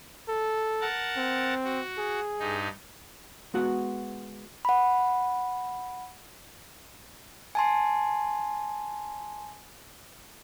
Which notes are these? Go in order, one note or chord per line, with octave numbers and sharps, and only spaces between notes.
A4
A#4 F#5 A5
C4
F#4
G#4
G2 D#4
G#3 B3 F#4 F#5
F#5 B5
G#5 A5 C6